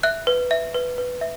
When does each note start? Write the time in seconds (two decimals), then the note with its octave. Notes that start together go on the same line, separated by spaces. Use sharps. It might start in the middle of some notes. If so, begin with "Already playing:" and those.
0.03 E5 F#6
0.27 B4
0.51 E5
0.74 B4
0.98 B4
1.21 E5